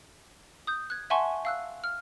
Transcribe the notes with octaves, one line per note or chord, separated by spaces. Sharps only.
D#6 G6
F#6 G#6
E5 F#5 G#5 A5 C6 C#6
F5 E6 F#6
F6